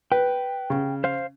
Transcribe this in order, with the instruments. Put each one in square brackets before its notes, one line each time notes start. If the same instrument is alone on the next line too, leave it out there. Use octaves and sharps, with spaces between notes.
[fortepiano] B4 [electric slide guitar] G5
[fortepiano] C#3
[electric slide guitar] C5 F5